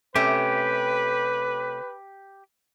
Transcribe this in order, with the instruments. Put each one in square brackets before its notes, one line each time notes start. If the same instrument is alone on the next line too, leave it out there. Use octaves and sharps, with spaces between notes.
[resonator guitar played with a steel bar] C3 A3 C#4 [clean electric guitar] G4 [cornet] B4